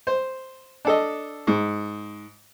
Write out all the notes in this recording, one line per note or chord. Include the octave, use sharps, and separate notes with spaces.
C5
D4 A4 D#5
G#2